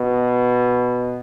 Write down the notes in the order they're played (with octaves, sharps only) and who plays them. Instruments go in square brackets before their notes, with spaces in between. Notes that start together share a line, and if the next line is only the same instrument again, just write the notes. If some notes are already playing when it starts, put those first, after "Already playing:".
Already playing: [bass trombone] B2